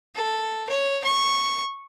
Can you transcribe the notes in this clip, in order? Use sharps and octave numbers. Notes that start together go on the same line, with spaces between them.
A4
C#5
C#6